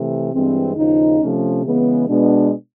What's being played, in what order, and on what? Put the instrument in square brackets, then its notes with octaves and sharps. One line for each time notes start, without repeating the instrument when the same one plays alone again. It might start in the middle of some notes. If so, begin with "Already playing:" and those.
Already playing: [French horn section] C3 E3 A3
G2 E3 G#3 C4
D#2 C#3 F3 D#4
C3 F3 A3 C#4
C#3 E3 G#3 B3
B2 G#3 B3 D4